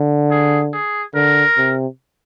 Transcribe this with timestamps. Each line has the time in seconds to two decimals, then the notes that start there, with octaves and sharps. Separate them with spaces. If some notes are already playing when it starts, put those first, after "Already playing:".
Already playing: D3
0.31 G#4
0.73 G#4
1.15 D3 A#4
1.57 C3